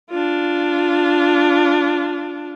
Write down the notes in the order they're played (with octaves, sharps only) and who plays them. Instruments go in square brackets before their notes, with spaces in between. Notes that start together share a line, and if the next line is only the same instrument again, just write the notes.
[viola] D4 F4